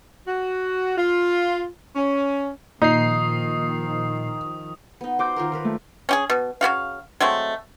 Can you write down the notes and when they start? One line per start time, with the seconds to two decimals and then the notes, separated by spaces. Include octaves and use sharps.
0.27 F#4
0.97 F4
1.96 C#4
2.82 A#2 D#3 F3 D#4 D#6 C7
5.01 B3 D#4
5.19 F#4 C5 D6 G6
5.36 D#3 F4 A#4
5.52 D#3 A#4 B4
5.64 A3
6.09 C#4 G4 G#4
6.30 B2
6.61 C#3 B3 F#4 F5
7.20 F#3 G#3 A3 C4